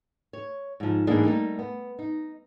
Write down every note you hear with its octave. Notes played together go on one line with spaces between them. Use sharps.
C#5
G#2 F3
G#2 E3 A#3 D4 G#4 D#5
G3 A3 A#3 D#4
B3
D#4